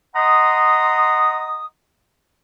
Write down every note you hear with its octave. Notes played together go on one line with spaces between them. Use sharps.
D#5 F#5 A#5 C6 D#6